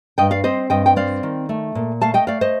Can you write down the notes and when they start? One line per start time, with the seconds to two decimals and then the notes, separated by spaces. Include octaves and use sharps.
0.18 G2 D#5 G5
0.31 D5 F5
0.44 C4 C5 D#5
0.70 G2 D#5 G5
0.86 G5
0.96 C4 D5 F5
1.23 D#3
1.49 A3
1.75 A#2
2.01 A3 F5 A5
2.14 D#5 G5
2.27 A3 D5 F5
2.41 C5 D#5